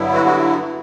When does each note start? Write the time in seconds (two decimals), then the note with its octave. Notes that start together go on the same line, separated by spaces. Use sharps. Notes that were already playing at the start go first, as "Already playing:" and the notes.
Already playing: G2 D3 F#3 B3 E4
0.14 F#4
0.26 F#4